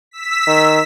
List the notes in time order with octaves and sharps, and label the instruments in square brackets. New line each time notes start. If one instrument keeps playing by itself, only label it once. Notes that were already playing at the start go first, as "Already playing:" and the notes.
[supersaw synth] E6 B6
[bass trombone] D#3